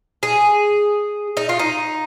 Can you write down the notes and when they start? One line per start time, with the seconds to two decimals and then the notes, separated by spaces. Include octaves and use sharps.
0.23 G#4
1.37 D#4
1.49 F4
1.59 D#4